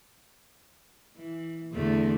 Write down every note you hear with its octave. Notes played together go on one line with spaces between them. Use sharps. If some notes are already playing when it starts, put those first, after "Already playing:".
E3
E2 D3 A3